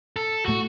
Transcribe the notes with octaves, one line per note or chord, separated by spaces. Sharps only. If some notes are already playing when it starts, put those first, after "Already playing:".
A4
A2 A3 F#4